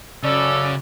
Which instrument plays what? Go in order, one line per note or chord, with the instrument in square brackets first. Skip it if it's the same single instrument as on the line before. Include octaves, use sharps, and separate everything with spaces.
[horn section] F#2 C#4 D5 [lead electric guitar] C#3 [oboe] A4